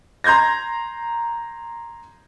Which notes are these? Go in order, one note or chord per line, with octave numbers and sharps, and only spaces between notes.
A#5 C6 G6 G#6 A#6